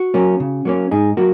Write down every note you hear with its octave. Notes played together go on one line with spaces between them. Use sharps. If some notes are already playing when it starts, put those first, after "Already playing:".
Already playing: F#4
F#3 A#3 C#4
C#3
F#3 A#3 C#4
G#2 D#4 G#4
F#3 A#3 F#4